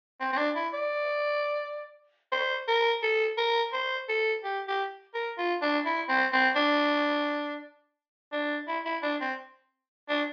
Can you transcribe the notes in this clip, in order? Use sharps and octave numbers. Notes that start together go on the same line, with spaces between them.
C4
C4
D4
E4
D5
C5
A#4
A4
A#4
C5
A4
G4
G4
A#4
F4
D4
E4
C4
C4
D4
D4
E4
E4
D4
C4
D4